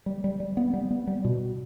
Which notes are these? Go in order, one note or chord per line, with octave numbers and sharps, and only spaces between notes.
G3
G3
G3
B3
G3
B3
G3
B2